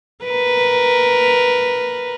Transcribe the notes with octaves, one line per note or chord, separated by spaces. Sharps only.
A#4 B4